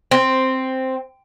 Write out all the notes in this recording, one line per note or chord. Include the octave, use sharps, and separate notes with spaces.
C4